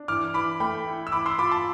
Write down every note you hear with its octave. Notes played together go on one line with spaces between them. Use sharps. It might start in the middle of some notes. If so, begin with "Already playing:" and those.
Already playing: D4
E3 D6 F6
E3 B5 D6
A3 G5 B5
E4
E6
E3 B5 D6
C6 E6
F4 B5 D6
A5 C6